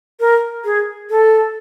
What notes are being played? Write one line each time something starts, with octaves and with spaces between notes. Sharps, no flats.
A#4
G#4
A4